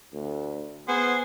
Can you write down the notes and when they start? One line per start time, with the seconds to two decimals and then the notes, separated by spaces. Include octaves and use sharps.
0.13 D2
0.88 B3 G#4 C5 F#5